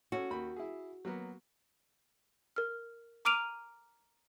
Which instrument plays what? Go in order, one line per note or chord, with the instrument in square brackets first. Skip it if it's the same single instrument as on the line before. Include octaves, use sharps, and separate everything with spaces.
[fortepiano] C#4 A4 C#5 [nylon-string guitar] F#4
[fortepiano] D#2 B5
E4 G#4
F#3 A#3 B3
[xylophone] A#4 F6
A#5 D6 F6 D7 D#7 F7